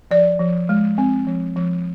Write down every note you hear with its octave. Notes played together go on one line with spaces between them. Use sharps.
F3 D5
F3
G#3
C4
F3
F3